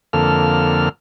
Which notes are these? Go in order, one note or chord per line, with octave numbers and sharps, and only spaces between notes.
F2 D3 A#3 A4 F6